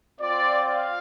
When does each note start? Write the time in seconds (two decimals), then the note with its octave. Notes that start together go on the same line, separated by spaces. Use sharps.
0.19 C4 F4 D5
0.66 F5